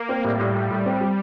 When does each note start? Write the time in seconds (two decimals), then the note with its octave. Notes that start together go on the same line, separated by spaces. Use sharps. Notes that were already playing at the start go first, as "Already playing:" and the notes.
Already playing: A#3
0.09 C4
0.24 A2 G3
0.39 A2
0.54 A2
0.70 A2 G3
0.86 C4
1.01 G3